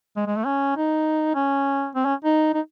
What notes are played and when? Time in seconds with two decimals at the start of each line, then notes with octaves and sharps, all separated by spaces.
0.17 G#3
0.27 G#3
0.36 A3
0.46 C#4
0.77 D#4
1.35 C#4
1.95 C4
2.05 C#4
2.25 D#4
2.54 D#4